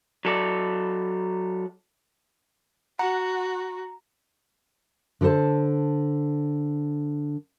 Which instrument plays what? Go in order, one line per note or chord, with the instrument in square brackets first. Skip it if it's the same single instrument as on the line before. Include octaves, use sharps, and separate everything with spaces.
[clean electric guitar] F#3 A4 D5
[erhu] F#4 [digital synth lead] F#5 [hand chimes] A#5
[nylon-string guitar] D3 G4 A4 C5 A5